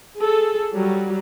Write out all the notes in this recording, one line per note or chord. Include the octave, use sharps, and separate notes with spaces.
G#4 A4
F#3 G3